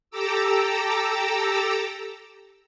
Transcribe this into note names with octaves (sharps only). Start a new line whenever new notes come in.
G4 A4 A#5 D6 E6